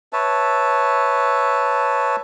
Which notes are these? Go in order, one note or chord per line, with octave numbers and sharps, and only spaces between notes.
B4 C#5 E5 A5